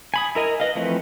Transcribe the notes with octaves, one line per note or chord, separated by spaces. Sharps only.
G#5 B5 D#6
E4 A#4 D#5 G#5
B4 D#5 F5
E3 F3 A3 C4 B4